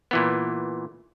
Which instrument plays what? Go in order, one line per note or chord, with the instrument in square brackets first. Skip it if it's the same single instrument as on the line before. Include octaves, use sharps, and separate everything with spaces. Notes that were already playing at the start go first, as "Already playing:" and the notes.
[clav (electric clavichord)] A#2 E3 B3